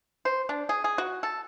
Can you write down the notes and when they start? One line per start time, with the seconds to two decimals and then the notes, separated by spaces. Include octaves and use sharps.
0.25 C5
0.49 D4
0.69 G#4
0.84 G#4
0.98 F#4
1.23 A4